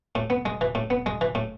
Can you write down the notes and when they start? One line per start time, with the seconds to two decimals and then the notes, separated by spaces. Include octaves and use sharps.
0.15 A2
0.30 B3
0.45 G#3
0.61 E3
0.75 A2
0.90 B3
1.06 G#3
1.21 E3
1.35 A2